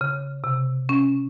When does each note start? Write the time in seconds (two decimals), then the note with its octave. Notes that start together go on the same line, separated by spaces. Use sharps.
0.01 C#3
0.44 C3
0.89 C#4